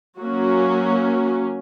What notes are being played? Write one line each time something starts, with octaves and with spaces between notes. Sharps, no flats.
F#3 A#3 C#4 F#4